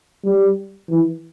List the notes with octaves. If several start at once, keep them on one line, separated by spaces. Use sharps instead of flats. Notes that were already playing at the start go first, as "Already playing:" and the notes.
G3
E3